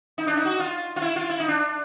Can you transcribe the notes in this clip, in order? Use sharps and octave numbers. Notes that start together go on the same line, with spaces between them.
D#4
D4
D#4
F#4
F4
F4
E4
F4
E4
D#4
D4